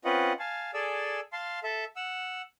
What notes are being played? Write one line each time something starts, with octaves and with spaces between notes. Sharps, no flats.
C4 C#4 F4 B4 D#5 F#5
F5 G#5 A5
G#4 A4 D5 G#5 E6
F5 A5 C6
A4 E5
F#5 E6